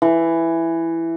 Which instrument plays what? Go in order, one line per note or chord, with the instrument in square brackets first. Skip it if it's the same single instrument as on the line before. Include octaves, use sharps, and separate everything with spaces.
[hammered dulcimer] E3